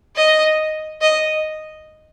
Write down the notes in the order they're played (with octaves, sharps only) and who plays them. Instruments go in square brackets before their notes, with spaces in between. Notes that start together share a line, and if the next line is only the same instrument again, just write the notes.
[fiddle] D#5
D#5